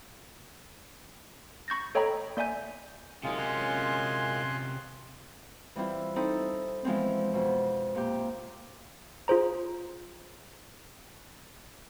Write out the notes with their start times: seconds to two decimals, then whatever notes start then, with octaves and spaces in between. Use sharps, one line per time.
1.68 B5 C#6 G6 A6 A#6
1.95 A4 C#5 D#5 G5 A#5 B5
2.37 A#3 D5 E5 G#5 G6
3.23 F#2 C3 G#3 C#4 D#4 F4 G#4
3.38 G#5 C6 F#6
5.76 E3 G3 C4 E4 F4
6.16 C4 D#4 E4 A4
6.85 E3 F3 G#3 B3 C4
7.33 F2 B2
7.95 A#2 G4
9.28 F4 G#4 C5 A#5